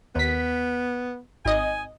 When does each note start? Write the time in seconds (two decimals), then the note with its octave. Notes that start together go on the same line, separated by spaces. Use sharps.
0.16 D#2 B3 B6
1.45 G#1 D#5 G#5